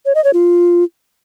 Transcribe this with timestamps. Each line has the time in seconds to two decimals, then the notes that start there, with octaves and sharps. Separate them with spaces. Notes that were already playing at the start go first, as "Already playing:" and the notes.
0.06 C#5
0.15 D#5
0.24 C#5
0.33 F4